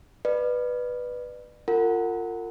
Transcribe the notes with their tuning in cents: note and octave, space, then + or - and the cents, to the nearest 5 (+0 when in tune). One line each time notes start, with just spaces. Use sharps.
B4 +0 D5 +35
F4 +0 A#4 -40 F#5 +0